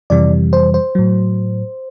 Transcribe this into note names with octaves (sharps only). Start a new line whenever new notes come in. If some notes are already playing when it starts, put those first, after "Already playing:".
F2 C3 E3 G3 D5
C5
C5
A2 F#3